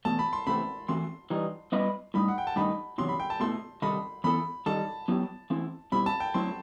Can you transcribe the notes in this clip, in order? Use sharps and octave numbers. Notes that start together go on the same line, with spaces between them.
E2 B2 A3 A5
B5
C6
C3 E3 A3 C4 B5
E3 A3 C4 F#4 C6
E3 G3 D#4
G3 B3 E4 B4 D#5
A2 G3 D#4 B5
F#5
G5
A5
G2 D#3 A3 D#4 B5
E2 C3 D#3 F#3 C6
B5
G5
A5
B2 A3 E4 C6
C3 D#3 G3 D#4 A4 B5
E3 B3 E4 A4 B5
D#3 G3 D#4 A4 A5
F#3 B3 E4 G4
E3 A3 C4 E4
B2 G3 C4 E4 B5
A5
G5
F#3 A3 C4 E4 C6